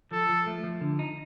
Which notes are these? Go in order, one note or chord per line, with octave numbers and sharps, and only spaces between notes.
F3 A4
F3
A3
F3
D3
D#4